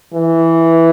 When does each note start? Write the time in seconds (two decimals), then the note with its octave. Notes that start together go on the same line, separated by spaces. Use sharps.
0.14 E3